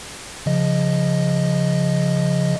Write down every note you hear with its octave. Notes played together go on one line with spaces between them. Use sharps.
C#3 F3 D#5